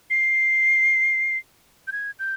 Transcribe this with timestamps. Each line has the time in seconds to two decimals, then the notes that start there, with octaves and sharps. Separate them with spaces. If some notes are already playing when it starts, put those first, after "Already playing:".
0.10 C7
1.88 G6
1.92 G#6
2.19 G6